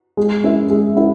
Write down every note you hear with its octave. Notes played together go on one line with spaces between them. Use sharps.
G#3
C#4 E4 A#4 E5
G#3
C#4 E4 A#4